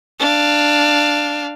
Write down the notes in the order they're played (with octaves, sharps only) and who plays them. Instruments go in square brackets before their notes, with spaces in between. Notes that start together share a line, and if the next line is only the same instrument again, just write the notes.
[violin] D4 F5